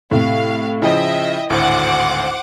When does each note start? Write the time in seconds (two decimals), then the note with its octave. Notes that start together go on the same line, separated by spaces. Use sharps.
0.11 A2 C3 F5
0.82 C#3 F3 E4 D#5 E5 G5
1.50 G#1 D2 A2 C5 F#5 D6